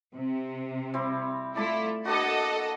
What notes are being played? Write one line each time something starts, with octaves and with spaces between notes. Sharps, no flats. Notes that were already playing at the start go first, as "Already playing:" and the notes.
C3
G3 C4 E4
A3 E4 F4 D5 A5 B5
A#3 D4 F#4 A4 D#5 F#5